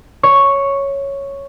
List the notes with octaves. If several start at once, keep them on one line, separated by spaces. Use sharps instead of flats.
C#5